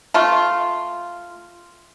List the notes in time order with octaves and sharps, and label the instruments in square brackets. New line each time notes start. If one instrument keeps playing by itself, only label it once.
[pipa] A3 F4